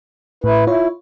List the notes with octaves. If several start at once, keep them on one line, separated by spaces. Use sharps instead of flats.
A2 E4 B4
E4 F4 C#5